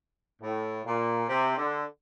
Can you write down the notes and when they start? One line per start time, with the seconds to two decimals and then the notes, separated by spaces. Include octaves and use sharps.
0.42 A2
0.86 A#2
1.29 C3
1.58 D3